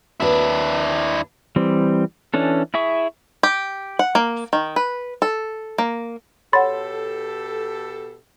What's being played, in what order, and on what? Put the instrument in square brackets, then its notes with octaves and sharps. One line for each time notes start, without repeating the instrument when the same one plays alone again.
[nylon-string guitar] D#2 F#4 B4 [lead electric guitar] D4 E4
[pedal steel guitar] E3 G3 C4
E3 C#4 D4 A4
E4 G#4 E5 C#6
[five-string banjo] G4
F#5
A#3
D#3
B4
A4
A#3
[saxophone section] B2 G4 A4 [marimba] C#5 F#5 [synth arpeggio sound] B5 C6 A6